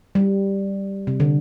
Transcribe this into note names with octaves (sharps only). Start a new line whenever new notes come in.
G3
C3
D3